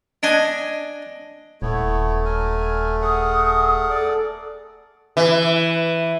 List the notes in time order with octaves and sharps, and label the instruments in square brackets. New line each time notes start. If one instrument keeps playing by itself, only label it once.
[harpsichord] D4 D#5 G#5
[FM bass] D#1 [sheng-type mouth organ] A3 [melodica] B3 E4 C#5
[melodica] F#3 A#4 G#5
[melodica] G#4 A#4 F#5 [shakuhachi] D#6
[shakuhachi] A4 [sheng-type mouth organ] D5
[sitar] E3